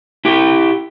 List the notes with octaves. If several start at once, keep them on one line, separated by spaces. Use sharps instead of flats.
E4 G4